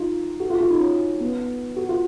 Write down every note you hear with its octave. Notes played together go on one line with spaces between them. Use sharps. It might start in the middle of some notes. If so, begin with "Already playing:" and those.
Already playing: D#4 F4
F#4
F4
F4
D#4
C#4
B3
F#4
F4